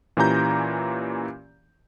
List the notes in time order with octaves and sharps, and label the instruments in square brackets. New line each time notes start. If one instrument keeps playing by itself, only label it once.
[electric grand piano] A#2 E3 C#4 G4 A#5 G6